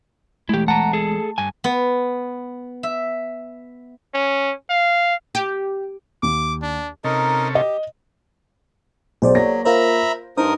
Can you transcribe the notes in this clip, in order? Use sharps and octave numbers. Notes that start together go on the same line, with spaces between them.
E3 G#3 A3 E4 G4
F#5 A5 A#5
G#4 A4
G2 G#5
B3
E5
C#4
F5
G4
D#2 D6
D4
C3 C#4 D#4 A4 A#4 D#5
G4 D#5
B1 G#4 C5 D5
F#3 A#3 C#5 A#6
F4 A#4 C5 E5 A#5 B5
G2 D#4 A#4 C5 D#6